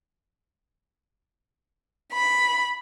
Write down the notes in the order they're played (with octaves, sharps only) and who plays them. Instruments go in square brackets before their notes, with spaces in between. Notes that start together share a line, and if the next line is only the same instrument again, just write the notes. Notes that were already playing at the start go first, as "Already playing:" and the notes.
[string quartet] B5